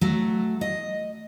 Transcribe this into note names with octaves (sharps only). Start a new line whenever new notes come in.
F#3 A3
D#5